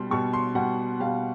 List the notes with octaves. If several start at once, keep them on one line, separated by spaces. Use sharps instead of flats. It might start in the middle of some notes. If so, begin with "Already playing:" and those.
Already playing: B2 G3 C6
B2 G3 C#6
C6
B2 G3 F#5
B2 G3 F5